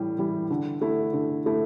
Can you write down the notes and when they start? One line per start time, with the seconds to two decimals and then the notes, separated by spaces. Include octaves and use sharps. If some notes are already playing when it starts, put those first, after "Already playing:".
Already playing: A2 E3 G3
0.18 E3 G3
0.50 D3
0.81 A3 E4
1.13 D3
1.46 A3 E4